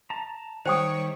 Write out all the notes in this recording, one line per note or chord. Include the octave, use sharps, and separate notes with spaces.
A5 A#5
D#3 G3 C5 C#5 G5 D#6